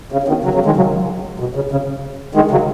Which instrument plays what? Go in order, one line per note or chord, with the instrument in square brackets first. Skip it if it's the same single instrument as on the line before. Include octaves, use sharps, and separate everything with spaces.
[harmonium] C#3
C#3
B2 D#3
C#3 F#3
C#3 F#3
D#3 G#3
C#3 F#3
B2
C#3
C#3
D#3 G#3
C#3 F#3